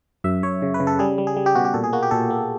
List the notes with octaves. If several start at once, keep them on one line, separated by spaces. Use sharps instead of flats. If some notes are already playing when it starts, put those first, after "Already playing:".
F#2 E5
F#2 C#5
C#3
B4
C#3
A4
G3 G#4
G3
G#4
G3
G4
B2 F#4
G4
A#2 A4
G#4
A#3 F#4
G4
A#2 A4
A#3